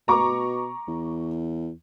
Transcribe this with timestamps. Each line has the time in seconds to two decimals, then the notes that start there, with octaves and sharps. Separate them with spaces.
0.08 B2 A#5 C#6 D6
0.88 E2